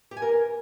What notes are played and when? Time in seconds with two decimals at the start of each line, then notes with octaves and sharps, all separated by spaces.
0.11 G4
0.17 G#5
0.22 A#4